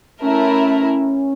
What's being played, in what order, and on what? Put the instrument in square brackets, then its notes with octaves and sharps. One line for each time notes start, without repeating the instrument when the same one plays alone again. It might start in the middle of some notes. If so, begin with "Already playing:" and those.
[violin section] A3 E4 A#4 [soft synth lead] C#4